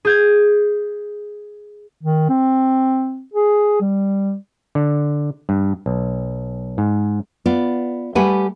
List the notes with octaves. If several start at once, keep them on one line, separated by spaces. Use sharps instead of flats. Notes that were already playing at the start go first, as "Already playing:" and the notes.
G#4 G6 G#6
D#3
C4
G#4
G3
D3
G2
B1
G#2
B3 F4 D5
G3 A3 G4 B4 F#5 G#5